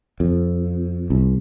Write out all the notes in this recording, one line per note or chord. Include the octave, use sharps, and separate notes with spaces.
F2
C2